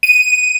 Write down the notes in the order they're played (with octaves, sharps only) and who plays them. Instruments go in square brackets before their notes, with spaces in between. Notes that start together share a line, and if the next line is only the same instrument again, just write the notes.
[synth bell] D#7